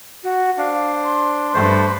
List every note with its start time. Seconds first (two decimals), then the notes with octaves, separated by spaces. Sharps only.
0.24 F#4
0.58 D4 C5 F5
1.04 C6
1.54 G2 A3 B4 C5